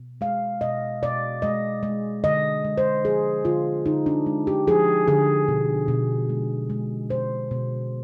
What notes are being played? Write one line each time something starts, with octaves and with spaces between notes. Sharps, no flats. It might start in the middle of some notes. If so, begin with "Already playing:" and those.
Already playing: B2
G#3 F5
B2 D#5
B2 D5
G#3 D#5
G#3
D3 D#5
G#3
C5
F3 G#4
D3 F4
D3 D#4
D4
G#3
G4
F3 G#4
D3 G#4
B2
B2
G#3
G#3
B2 C5
B2